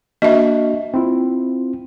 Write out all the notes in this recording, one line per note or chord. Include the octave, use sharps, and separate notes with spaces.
A#3 D4 F#4 D#5 E5
C4 E4 F4